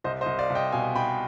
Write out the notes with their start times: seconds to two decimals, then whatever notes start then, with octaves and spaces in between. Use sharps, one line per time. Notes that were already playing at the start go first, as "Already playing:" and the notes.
0.04 C2 C5 D#5
0.21 C5 D#5
0.26 C2
0.39 D5 F5
0.50 C2
0.55 D#5 G5
0.72 B2 F5 G#5
0.95 B2 G5 B5